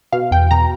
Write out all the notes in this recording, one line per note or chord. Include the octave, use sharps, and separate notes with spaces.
B2 F5
E2 G5
B2 A#5